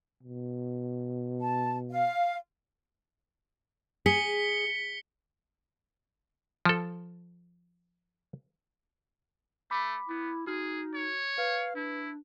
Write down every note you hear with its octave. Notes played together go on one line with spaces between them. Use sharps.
B2
A5
F5
G#4 B6 C#7 G7
F3 A4
A3 B5 D6 B6
B3 E4
D#4 F#4 G#4 F6
C#5
B4 F5
D4 E4